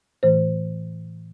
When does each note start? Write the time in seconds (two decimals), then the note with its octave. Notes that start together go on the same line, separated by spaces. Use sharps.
0.23 A2 E3 A3 C5